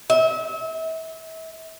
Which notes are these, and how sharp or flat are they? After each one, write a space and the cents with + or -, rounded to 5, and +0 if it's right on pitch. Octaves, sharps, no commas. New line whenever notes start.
E5 -35